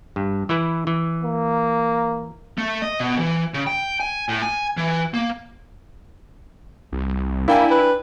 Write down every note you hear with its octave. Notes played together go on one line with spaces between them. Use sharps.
G2
E3 E4 B4
E3
A#3
A3
D#5
B2
E3
C#3
G5
G#5
A2
G#5
E3
A#3
C2
A#3 D4 E4 G5 G#5
B4